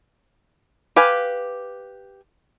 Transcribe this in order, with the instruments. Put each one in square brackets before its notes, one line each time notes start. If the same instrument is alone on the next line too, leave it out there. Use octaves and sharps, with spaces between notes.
[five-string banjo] G4 B4 F5 G#5